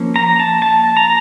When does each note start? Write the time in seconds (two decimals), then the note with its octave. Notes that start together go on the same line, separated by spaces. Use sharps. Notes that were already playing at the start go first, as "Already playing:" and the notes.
Already playing: F3 A#3 C#4
0.16 A#5
0.40 A5
0.62 A5
0.97 A#5